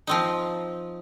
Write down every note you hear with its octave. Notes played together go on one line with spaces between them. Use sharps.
F3 C4 D#4